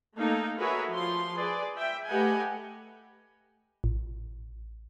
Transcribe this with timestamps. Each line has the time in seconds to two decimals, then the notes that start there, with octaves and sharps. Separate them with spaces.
0.17 A3 A#3 D#4 A4 F5
0.58 F#4 G#4 A#4 B4 C#5 E5
0.93 F3 F4 C6
1.36 G#4 B4 D5
1.77 E5 G5
2.08 A3 G4 B4 D#5 F#5 G#5
3.84 A1